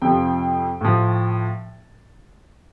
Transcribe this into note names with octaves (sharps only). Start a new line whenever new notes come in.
F2 C3 F3 G5
A2 F3